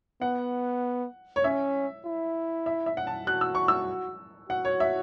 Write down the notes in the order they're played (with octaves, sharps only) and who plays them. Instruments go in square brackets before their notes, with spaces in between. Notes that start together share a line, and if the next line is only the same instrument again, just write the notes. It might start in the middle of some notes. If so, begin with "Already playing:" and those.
[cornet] B3 [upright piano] F#5
[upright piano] C#5
[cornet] C#4 [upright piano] E5
[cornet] E4
[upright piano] E5
E5
F#5
A5
[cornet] F#4 [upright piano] F#6
[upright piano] E6
C#6
E6
[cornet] F#4 [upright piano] F#5
[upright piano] C#5
E5